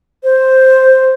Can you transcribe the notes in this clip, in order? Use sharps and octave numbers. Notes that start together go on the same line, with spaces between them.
C5